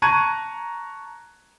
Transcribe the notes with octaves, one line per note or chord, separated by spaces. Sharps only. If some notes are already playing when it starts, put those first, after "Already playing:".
A5 A#5 C#6 F#6 G#6 D#7